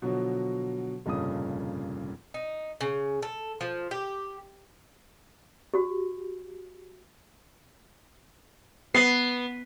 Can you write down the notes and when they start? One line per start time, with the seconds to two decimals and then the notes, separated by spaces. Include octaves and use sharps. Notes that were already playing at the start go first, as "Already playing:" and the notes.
0.02 B2 D3 F3 F#3
1.06 F1 G2 A#2 C#3 D#6
2.34 D#4
2.81 C#3
3.23 A4
3.61 F3
3.91 G4
5.74 F#4 G4
8.94 B3 C7